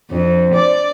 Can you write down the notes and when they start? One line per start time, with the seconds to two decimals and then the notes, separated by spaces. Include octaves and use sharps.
0.11 F2 D4 C5
0.54 D5